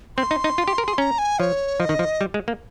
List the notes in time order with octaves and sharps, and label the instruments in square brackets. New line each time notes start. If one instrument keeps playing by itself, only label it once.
[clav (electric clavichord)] C4 [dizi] C6
[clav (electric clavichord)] D#4
D#4
F4
G4
A#4
G#4
[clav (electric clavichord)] C#4 [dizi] A#5
[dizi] G#5
[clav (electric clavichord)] F3 [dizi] C#5
[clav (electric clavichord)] F3 [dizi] D#5
[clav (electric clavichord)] D#3
F3
G3
G#3
A#3